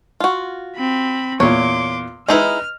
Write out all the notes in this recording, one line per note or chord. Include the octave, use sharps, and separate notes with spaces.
F4 F#4
C4 B5
E2 A#2 C#5 C6 D6
G#3 D#4 E4 B4 D#5 F6